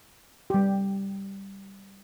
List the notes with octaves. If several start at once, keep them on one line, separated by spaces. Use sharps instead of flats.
G3 G4